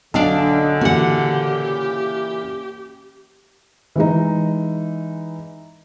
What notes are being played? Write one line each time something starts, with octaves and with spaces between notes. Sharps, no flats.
B1 D3 D4 F5 A5
A#2 C#3 E3 F#4 G4 F#5
E3 G#3 D#4